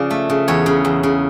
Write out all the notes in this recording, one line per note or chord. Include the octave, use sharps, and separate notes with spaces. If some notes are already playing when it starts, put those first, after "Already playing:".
Already playing: C#3 F3 D5
A3
C#3
E2 C#5
C#3
E2
C#3